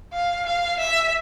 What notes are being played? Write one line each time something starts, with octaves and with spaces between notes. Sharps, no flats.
F5
F5
E5